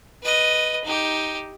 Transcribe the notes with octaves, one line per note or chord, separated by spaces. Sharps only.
B4 D#5
D#4 G4